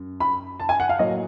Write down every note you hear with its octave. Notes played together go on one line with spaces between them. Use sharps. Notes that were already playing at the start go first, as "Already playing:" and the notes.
Already playing: F#2
B5
A5
G#5
F#5
F5
A2 F#3 A#3 D#5